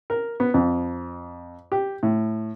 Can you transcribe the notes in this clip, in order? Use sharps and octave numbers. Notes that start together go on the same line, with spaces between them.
A#4
B3
F2
G4
A2